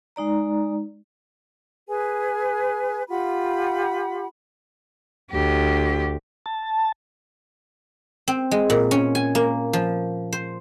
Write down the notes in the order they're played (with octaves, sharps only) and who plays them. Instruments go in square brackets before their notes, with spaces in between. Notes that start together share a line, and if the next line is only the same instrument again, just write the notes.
[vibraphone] G#3 D#4 D5 A#5
[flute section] G#4 B4 G#5
F4 G4 F#5 B5
[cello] D2 G4
[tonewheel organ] A5
[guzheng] C4
G#3
A#2
C#4
G#5
A#3
F3
C5